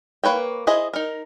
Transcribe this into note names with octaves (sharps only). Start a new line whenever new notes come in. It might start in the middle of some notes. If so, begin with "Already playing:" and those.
A#3 B4 C#5 G5
E4 G#4 C5 D#5
D#4 A#4